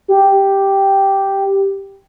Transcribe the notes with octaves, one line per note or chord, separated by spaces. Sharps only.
G4